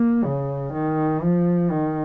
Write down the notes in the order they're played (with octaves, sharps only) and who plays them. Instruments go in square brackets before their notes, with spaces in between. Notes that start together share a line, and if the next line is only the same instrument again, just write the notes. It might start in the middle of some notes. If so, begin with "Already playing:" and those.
Already playing: [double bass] A#3
C#3
D#3
F3
D#3